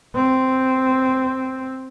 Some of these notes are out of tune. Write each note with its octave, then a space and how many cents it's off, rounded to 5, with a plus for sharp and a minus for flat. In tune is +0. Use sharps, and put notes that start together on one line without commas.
C4 -5